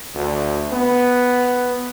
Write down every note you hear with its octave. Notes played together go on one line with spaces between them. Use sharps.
D2
B3